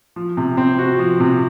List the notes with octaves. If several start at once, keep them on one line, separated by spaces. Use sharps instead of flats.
F3
C3
C4
F#4
F3
C3